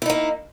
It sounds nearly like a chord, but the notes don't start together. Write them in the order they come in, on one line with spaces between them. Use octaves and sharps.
E4 D#4 A#3